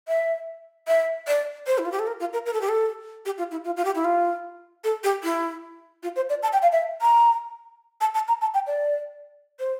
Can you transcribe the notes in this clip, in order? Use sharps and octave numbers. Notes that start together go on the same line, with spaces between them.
E5
E5
D5
C5
E4
F4
G4
A4
A#4
F4
A#4
A#4
A4
G4
A4
G4
F4
E4
F4
F4
G4
E4
F4
A4
G4
E4
F4
C5
D5
A5
G5
F5
E5
A#5
A5
A5
A#5
A5
G5
D5
C5